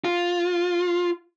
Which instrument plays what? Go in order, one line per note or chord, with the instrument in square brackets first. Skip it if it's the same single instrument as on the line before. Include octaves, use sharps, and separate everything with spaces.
[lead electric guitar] F4